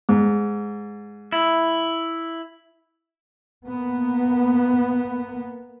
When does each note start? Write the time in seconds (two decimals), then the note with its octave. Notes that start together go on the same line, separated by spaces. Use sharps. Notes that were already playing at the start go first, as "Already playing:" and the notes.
0.09 G#2
1.32 E4
3.65 A#3 B3